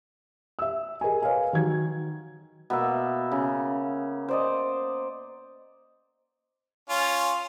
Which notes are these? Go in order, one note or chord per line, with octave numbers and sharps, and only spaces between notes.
E5 E6
G#4 A#4 D#5 G#5
B4 C#5 D#5 F5 G#5
D#3 F#3 G#6
B2 A#3 E5
C#3
C5 D5 D#5
C#4 F4